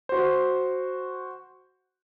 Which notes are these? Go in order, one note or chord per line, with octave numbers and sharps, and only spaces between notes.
F#4 C5